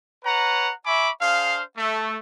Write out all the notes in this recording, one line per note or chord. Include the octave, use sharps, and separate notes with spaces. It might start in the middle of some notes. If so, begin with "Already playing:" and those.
B4 C#5 F#5 A#5
E5 G#5 B5 C#6 D6
D4 G#4 C5 F5
A3